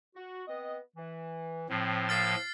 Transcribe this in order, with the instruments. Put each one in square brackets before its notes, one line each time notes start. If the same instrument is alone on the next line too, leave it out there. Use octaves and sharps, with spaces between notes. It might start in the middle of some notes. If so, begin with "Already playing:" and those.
[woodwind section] F#4
B3 C4 D#5
E3
[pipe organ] A2 F3 [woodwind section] C4
[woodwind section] A#3 A5 [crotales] F6 A6 C7